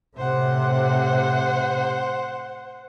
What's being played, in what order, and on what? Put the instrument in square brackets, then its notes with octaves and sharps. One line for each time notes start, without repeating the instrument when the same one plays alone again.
[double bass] A2 C3 [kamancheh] C5 F#5